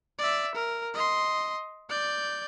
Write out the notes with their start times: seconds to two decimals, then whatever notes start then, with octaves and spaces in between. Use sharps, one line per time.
0.19 D5 E5
0.55 A#4
0.94 D#5 C6
1.90 D5 G6